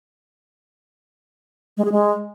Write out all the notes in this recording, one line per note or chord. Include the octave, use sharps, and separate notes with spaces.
G#3
G#4
G#3